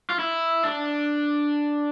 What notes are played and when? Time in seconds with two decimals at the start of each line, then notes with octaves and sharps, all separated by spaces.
0.10 F4
0.19 E4
0.64 D4